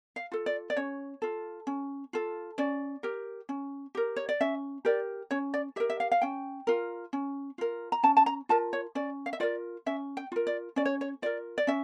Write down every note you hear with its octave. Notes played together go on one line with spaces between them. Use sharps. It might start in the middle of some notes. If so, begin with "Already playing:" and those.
F5
F4 A4
D5
D5
C#4 C#5
F4 A4
C#4
F4 A4
C#4 D5
G4 A#4
C#4
G4 A#4
C#5
D5
C#4 E5
G4 A#4 D5
C#4 C#5
D5
G4 A#4 E5
E5
F5
F5
C#4 G5
F4 A#4
C#4
F4 A#4
A#5
C#4 A5
A5
A#5
F4 A#4 A5
C#5
C#4 D5
F5
E5
F4 A#4 D5
C#4 E5
G5
F4 A#4
D5
C#4 D5
C#5
C#5
F4 A#4 D5
D5
C#4 E5